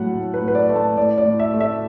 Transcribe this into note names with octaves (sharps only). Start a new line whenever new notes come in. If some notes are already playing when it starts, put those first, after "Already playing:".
Already playing: A2 F#3 A3 F#5
A2
B4
A2
B4
D5
A3
A5
A2 D5
D5
A2
E5
A3
E5